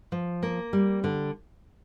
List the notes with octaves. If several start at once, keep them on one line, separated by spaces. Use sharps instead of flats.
F3
A#3
G3
D3